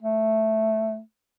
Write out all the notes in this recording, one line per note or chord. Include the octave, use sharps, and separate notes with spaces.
A3